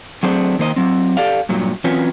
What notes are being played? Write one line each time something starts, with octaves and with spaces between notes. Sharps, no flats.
F#3 A3 C4 D4 G#4 C5
D#3 A#3 C5 D#5
F#3 C4
G4 A4 D5 F5
G2 A#2 F#3
E3 F#3 C4 C#4 F4 B4